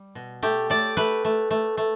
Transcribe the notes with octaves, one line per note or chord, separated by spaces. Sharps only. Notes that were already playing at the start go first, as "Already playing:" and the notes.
Already playing: G3
B2
A3 G4
A3 D5
A3 B4
A3
A3
A3